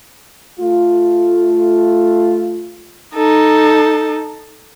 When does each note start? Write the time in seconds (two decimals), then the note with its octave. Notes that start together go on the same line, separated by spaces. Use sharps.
0.60 A3 F4
3.15 D#4 A4